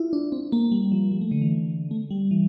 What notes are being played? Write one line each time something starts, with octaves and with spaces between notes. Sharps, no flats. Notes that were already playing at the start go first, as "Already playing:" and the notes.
Already playing: E4 F4
D4
C4
A#3
G3
F3
G3
A3
D3
E3
A3
G3
E3